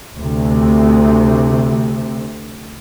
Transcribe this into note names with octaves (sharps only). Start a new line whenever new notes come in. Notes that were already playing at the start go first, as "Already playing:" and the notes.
D2 C3